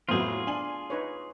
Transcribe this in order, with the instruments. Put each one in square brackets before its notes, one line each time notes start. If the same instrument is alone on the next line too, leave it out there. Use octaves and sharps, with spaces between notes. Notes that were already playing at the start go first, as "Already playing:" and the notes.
[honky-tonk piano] F2 A2 F#3 [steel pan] A3 B3 C5 [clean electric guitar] F4 G#4
[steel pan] D4 [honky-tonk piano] G#5 F#7
[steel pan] D#4 B4 C#5